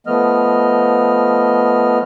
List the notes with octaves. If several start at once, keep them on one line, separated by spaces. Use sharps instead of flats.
F3 A3 B3 D#5 F6